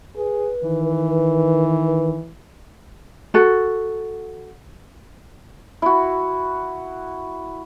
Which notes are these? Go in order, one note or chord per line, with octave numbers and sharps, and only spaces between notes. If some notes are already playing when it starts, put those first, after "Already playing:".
G#4 B4
D#3 E3
F#4 A4
E4 F#4